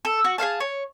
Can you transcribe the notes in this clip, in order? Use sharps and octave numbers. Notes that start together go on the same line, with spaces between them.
A4
F#4
G#4 C5 F5 A5
C#5